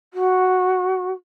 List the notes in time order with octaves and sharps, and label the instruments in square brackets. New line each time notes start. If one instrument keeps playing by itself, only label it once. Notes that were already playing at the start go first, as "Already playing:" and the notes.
[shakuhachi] F#4